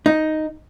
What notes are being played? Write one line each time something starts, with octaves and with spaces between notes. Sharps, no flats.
D#4